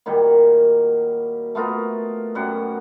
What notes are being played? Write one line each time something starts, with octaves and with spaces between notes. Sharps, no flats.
A#2 D#3 F#3 G3
A3 B3 F4 A#4
F#2 F#3 G3 F#5